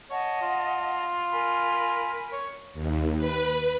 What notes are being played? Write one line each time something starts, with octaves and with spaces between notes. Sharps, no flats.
C#5 D#5 F#5 A5
F4
A#4 G#5 B5
C#5
D#2
B4